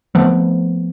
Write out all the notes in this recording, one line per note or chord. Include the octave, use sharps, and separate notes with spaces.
F3 A3 B3 C4